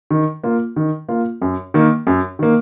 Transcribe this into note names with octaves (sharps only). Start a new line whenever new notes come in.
D#3
A#3 F4
D#3
A#3 F4
F#2
D#3 A#3
F#2
D#3 A#3